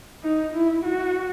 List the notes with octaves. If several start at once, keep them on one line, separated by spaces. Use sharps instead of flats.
D#4
E4
F#4